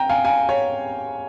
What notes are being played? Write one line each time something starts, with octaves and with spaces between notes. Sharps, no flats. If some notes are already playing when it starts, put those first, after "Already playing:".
Already playing: G5 A#5
F5 G#5
F5 G#5
C#5